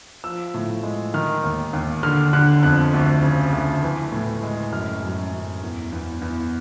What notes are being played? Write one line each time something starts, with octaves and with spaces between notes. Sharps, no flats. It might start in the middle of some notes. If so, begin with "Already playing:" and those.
F3 E6
A2
G#3
D#3 F6
D#2
D#2
D3 F6
D3 F#6
F2 F#6
D2
C#3
D2
E3
A2
G#3
F#2 F6
F#2
F#2
E2
E2
E2